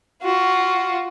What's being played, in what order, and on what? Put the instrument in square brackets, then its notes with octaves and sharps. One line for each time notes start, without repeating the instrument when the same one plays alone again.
[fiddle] F4 F#4